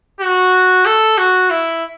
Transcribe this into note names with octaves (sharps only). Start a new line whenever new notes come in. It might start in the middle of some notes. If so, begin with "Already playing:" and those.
F#4
A4
F#4
E4